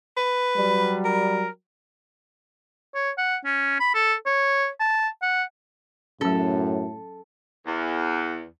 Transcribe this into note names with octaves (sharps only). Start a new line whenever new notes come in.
B4
F#3 G3
A#4
C#5
F#5
C#4
B5
A4
C#5
A5
F#5
F#2 A2 F#3 C#4 A4
E2